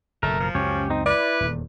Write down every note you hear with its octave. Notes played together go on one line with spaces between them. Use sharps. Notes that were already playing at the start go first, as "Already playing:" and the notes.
F#1 B2 A3 A#4
F3
C#2 F#2 C#4 G4 C#5
C4 D#4
E4 B4 D5
D#1 E2